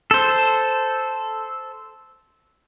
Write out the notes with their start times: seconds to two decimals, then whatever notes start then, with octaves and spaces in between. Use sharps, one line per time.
0.11 A4 C5